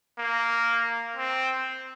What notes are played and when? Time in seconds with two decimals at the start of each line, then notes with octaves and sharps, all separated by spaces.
0.18 A#3
1.16 C4